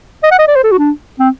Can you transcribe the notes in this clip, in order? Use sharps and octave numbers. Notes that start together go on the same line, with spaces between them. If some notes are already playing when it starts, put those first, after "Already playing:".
D#5
F#5
D#5
D5
C5
A4
F#4
D4
C4